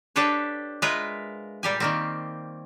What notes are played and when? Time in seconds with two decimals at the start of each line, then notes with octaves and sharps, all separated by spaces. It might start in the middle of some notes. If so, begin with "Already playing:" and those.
0.16 D4 G4 A4 B4 C#5
0.82 G#3 F4 A#4 B4 E5
1.63 A#2 G3 G4 G#5
1.80 D#3 A#3 C4